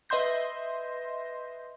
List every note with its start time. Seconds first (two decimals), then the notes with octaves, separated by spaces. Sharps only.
0.09 B4 D#5 E5 C6 G6 A#6